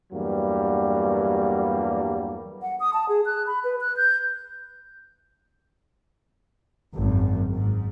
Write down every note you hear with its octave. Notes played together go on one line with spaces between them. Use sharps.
E2 G2 F#3 G3 A#3
F#5
D#6
A5
G#4
F#6
B5
B4
F#6
G6
G#1 F#2
G#2